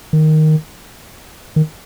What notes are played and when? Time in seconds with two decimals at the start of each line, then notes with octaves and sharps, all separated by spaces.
0.13 D#3
1.56 D#3